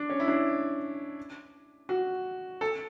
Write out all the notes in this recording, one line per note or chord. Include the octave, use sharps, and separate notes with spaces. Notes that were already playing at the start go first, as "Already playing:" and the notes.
Already playing: D4
C#4
E4
D4
F#4
A4